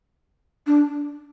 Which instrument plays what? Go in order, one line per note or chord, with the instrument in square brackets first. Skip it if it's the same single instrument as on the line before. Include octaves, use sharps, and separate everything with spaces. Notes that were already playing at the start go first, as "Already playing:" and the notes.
[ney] D4